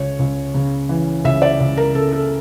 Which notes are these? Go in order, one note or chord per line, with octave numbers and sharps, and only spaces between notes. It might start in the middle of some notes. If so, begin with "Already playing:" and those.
Already playing: C#2 C#5
C#2
C#3
E3
C#2 E5
D5
C#2
A#4
C#3 A4
A4